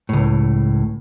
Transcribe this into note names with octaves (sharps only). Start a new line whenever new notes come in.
C#2 A2